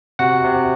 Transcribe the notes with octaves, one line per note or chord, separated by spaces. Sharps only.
C3 F#4 F#5
C3